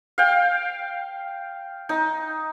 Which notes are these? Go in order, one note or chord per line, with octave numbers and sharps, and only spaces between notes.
F5 G5
D#4